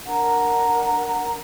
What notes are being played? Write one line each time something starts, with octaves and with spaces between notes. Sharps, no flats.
D4 A#4 F#5 A#5